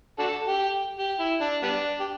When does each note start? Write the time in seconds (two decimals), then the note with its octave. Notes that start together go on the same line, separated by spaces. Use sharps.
0.19 D4 F#4 A4
0.48 G4
0.98 G4
1.19 E4
1.41 D4
1.62 G3 B3 D4
2.00 G4